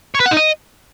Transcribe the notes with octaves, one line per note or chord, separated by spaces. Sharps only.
C#5
B4
F#5
D#4
D#5